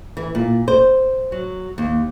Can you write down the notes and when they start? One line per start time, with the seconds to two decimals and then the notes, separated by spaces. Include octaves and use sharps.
0.17 E3
0.35 A#2
0.68 C5
1.32 F#3
1.78 D#2